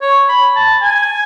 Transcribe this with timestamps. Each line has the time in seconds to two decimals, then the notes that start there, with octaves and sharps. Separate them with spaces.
0.02 C#5
0.29 B5
0.56 A5
0.82 G#5